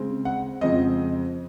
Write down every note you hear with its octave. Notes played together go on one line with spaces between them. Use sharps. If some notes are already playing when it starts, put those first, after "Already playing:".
Already playing: C#3 G#3 C4
F#5
F2 C#3 F3 G#3 C4 D#5